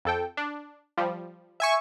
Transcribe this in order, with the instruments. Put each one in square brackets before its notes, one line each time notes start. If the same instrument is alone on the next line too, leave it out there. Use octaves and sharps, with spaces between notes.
[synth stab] F2 A4 G5
D4
F3 G3
[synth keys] E5 G#5 C#6